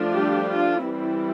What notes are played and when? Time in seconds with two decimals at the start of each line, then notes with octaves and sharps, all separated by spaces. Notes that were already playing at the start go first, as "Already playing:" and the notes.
Already playing: F3 A3 D4 F4
0.15 G3 G4
0.50 F4
0.84 E3 G3 C4 E4